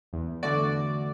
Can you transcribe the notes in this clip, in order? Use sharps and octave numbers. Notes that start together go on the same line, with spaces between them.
E2
D3 A3 F#4 D5